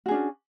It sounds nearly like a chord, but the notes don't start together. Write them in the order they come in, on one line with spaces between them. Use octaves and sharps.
F#4 G#4 D4 C#4